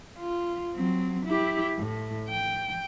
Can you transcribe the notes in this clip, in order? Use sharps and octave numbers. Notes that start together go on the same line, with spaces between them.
F4
F#3 C4
E4 G4
A2
G5